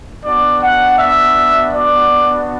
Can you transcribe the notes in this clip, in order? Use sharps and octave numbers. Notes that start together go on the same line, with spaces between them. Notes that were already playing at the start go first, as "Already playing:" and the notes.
B3 D4 F#4 D5
F#5
E5
D5